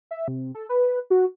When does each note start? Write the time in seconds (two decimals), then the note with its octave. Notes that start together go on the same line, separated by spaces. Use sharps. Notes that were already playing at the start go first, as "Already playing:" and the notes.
0.11 E5
0.28 C3
0.55 A4
0.69 B4
1.10 F#4